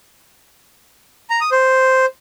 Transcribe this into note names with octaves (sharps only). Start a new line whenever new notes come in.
A#5
D#6
C5